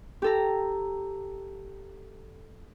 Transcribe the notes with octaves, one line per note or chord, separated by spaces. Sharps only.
G4 A4 A#5